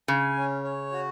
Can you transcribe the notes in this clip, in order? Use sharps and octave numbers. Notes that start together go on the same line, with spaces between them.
C#3 G#5
C#4
C#5
F#4